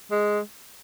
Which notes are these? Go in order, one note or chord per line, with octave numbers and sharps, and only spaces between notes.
G#3